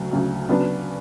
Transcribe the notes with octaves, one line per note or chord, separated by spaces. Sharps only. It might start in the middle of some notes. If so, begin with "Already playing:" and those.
Already playing: D2 C#3 F#3
D2 C#3 F#3
C#3 F#3 B3 D4